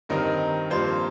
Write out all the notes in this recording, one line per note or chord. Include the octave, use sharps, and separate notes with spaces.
G2 D#3 C4 A#4 D#5
G2 F3 A#3 C5